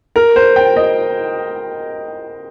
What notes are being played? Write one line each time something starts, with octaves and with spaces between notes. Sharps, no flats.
A#4
C5
G5
D#5